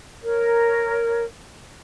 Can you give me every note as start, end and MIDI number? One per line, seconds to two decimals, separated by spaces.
0.22 1.21 70
0.22 1.21 73